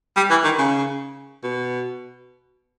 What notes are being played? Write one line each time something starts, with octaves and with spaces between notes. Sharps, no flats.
G3
E3
D#3
C#3
B2